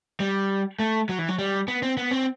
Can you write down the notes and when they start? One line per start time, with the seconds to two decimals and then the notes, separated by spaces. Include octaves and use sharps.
0.20 G3
0.79 A3
1.09 F#3
1.19 E3
1.28 F#3
1.39 G3
1.68 B3
1.83 C4
1.97 B3
2.11 C4